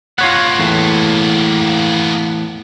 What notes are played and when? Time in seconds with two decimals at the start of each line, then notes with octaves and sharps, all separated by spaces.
0.18 A#3 B3 F4 C#5 F#5
0.58 E2 A2